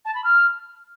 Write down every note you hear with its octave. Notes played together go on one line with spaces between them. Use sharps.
A5
B5
F6